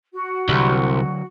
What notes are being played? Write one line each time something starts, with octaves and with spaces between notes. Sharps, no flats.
F#4
C2 D3 F#3